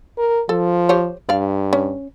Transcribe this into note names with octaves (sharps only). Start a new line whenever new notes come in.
A#4
F3 A4
G4 C5 C#5
G2 D5 F5
C#4